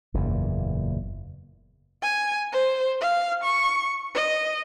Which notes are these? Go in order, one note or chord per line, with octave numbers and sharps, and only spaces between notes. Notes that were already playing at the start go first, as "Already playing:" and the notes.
F#1 E2 A#2
G#5
C5
F5
C#6
D#5